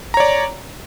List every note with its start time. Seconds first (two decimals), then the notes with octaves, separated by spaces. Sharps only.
0.14 A#5
0.17 C#5
0.20 D5